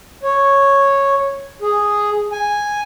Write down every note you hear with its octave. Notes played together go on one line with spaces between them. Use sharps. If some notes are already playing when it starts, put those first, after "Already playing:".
C#5
G#4
G#5